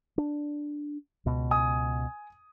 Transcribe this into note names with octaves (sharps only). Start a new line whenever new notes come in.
D4
C#2 B2
G#5 D#6